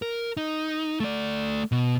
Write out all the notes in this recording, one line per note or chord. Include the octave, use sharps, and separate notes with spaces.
A#4
D#4
A3 D5
B2